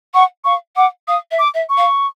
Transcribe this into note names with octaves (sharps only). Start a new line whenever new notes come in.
F#5 C#6
F5 C#6
F#5 D6
F5 D#6
E5
D6
E5
C#6
F5